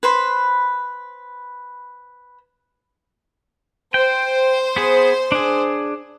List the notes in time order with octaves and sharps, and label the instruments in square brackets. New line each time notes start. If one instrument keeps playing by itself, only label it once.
[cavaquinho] B4 C5 B5
[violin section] C5 [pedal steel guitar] G5
[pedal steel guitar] B3 G#4
D4 G#4